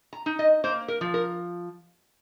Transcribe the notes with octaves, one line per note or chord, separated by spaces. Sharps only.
A#5
D#4
D#5
A#3 C5
A#4
F3
A#4